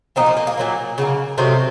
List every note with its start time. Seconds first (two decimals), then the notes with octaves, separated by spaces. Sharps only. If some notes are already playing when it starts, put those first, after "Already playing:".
0.16 A#2 F3 A#3 C4 D#4
0.26 C4
0.37 A#3
0.47 A#3
0.57 A#2 F#3 A#3
0.98 C#3 F#3 A#3
1.38 C3 D#3 F#3 A3 C4